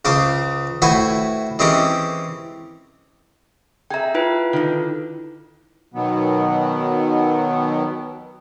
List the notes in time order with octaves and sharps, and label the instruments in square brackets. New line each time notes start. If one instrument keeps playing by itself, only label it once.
[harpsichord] C#2 C#3 C5 D6
A2 E4 F#4 B4 C5 G#5
E3 G#3 C4 C#4 G4 A#4
[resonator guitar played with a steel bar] G#4 E5 [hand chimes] G5 A#5
[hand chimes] E4 F4 B4
[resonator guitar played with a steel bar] D3 D#3
[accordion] B2 D#3 F#3 B3